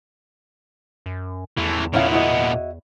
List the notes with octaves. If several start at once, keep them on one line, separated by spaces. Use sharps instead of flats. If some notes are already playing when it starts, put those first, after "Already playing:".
F#2
E2 E3 A3
A#2 B3 C#4 E4 F5
E4 F#4 D#5